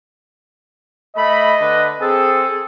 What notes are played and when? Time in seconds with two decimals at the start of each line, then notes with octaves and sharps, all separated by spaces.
1.17 A3 D#5 B5
1.60 D3 B4
2.01 C4 G#4 A4